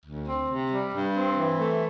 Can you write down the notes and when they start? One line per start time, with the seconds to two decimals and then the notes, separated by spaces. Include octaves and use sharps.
0.06 D2
0.28 C4
0.50 C3
0.72 G3
0.94 G2
1.16 C4
1.38 E3
1.60 A3